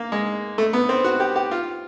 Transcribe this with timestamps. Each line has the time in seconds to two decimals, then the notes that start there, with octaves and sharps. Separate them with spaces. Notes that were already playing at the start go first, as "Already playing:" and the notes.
Already playing: A#3
0.12 G#3
0.58 A3
0.73 B3
0.89 C4
1.04 F#4
1.20 G4
1.36 G4
1.51 F4